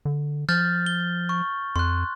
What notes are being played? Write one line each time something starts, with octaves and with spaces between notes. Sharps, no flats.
D3
F3 F6 G6 A6
G7
C#6
F2 C6 F#6